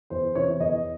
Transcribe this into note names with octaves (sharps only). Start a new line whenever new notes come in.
E2 C5
C3 E3 C#5
E2 D#5